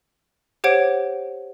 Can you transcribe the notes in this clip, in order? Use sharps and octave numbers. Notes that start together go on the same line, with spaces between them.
G4 C5 C#5 F#5 G#6 D7